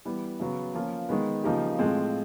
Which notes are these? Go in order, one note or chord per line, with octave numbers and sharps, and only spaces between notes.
E3 G3 B3
C#3 F#3 B3
F3 A#3 C#4 F4
D#3 G#3 B3
C#3 F3 A#3 D#4 G4
A2 F3 G#3 C4